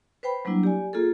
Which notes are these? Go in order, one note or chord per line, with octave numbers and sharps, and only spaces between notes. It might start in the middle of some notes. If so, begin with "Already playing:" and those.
B4 C5 G5 B5
F#3 G3 A#3 D4 E4
G4 D5 G#5
A#3 F4 G#4 A4